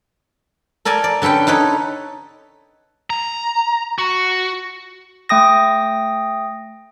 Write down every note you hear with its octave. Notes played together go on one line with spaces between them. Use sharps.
A4 A#4 D5 G#5 A#5
D5
D3 C#4 A4 B4 G5
D#4 A4 B4 C#5
A#5
F#4
A3 G5 D#6 A#6